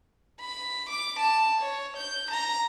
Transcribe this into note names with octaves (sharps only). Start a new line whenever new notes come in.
B5
D6
A5
C#5
G6
A#5